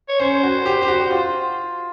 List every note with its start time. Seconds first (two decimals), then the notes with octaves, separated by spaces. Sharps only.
0.09 C#5
0.20 C#4 C5
0.43 F#4
0.66 G4
0.82 G4
0.88 F#4
1.11 F4